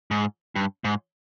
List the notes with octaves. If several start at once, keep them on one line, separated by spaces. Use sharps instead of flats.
G#2
G2
G#2